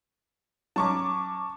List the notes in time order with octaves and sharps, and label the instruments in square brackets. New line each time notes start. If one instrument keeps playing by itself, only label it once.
[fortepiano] F#3 C#4 [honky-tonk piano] A5 C#6 D6